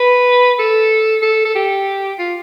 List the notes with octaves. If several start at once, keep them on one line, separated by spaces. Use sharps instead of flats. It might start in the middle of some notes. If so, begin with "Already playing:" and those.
Already playing: B4
A4
A4
A4
G4
F4